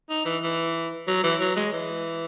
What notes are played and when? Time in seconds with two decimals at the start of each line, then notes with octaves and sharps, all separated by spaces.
0.10 D#4
0.26 E3
0.43 E3
1.07 F#3
1.24 E3
1.40 F#3
1.56 G#3
1.72 E3